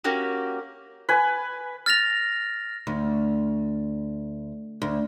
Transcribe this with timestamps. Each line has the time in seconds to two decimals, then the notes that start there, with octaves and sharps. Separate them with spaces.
0.04 A#3 C#4 F#4 G4
1.09 B4 G#5
1.86 F6 A6 A#6 F7
2.87 D2
4.82 D2